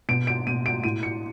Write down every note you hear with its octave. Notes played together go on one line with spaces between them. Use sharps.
B2 D7
D7
B2 D#7
D7
A2 D#7
C#7